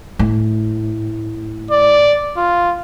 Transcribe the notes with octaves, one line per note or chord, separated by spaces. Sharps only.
A2
D5
F4